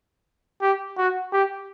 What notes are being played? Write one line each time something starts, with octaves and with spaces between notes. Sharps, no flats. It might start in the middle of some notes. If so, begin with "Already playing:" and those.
G4
F#4
G4